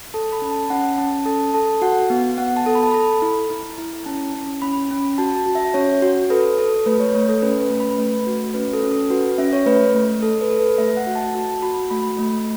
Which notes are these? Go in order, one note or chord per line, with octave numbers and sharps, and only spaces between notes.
A4 A5
B5
C#4
A5
C#4 F#5
C#4 A5
A4 A5
A4 A5
F#4 F#5
B3
B3 F#5
A5
A4
B5
A5
A4 B5
E4
E4
E4
C#4 A5
C#4
C#4 B5
C#4
F#4 A5
A5
F#4
E5
C#4 C#5
F#4
A4 B4
A4
A3 B4
C#5
A3 C#5
A4
C#4 B4
B4
A3
B5
A3 B4
F#4
C#4 B4
A4
C#4
A4
F#4 B4
C#4 E5
C#5
A3 B4
A3
A4
B4
A4
B4
A3 E5
F#5
F#4
A5
F#4 A5
F#4 B5
A3 B5
A3